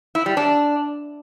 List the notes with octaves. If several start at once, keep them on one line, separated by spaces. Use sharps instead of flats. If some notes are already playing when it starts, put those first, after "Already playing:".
E4
G3
D4